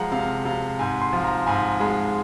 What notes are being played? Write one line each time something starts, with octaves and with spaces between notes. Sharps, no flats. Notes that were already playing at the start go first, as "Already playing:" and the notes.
Already playing: F3 G#3 F#5 A#5
C3 F5
C3 F5
G#2 G#5
C6
F3
A#5
G#2 G#5
G#3